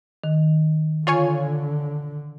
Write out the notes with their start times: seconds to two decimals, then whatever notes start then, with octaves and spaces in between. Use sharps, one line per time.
0.24 D#3
1.07 D3 F4 C#5 G#5